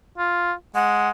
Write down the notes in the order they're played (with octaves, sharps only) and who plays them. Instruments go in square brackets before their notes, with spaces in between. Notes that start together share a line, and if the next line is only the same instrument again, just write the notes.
[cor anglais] F4
[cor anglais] G#3 [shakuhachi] F#5